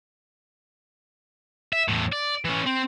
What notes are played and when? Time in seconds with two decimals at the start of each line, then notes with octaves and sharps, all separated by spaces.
1.73 E5
1.88 E2 A2
2.12 D5
2.45 E3 C#4
2.66 C4